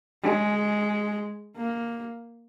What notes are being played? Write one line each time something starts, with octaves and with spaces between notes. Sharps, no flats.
G#3
A#3